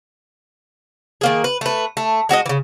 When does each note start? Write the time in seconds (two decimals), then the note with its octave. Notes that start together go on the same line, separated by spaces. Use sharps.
1.21 D#3 A#3 G#4
1.44 B4
1.61 A3 B4
1.97 A3
2.29 G#3 F#4 G4 D#5
2.46 C#3 E3